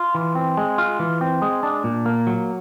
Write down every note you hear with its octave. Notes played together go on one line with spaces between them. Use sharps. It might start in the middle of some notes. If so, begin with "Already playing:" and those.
Already playing: F4
E3
C4
G#3
F4
E3
C4
G#3
D4
A#2
A#3
F#3